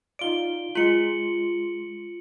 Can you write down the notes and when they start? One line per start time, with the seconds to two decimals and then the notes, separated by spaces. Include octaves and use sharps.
0.19 D#4 F4 D5 D7 G7
0.75 G#3 F4 C6 C#7 F#7